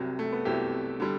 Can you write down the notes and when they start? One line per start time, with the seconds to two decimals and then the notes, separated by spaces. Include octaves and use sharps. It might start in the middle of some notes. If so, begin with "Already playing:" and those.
Already playing: C2 C3 F#3
0.19 A3
0.32 B3
0.45 C2 C3 F#3 E4 G4
1.00 D3 G3